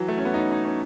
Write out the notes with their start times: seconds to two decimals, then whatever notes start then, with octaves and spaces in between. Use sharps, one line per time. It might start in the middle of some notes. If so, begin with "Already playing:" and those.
Already playing: E3 F#3
0.08 A3
0.18 C#4
0.25 B3
0.34 D#4
0.38 C#4
0.52 D#4
0.64 C#4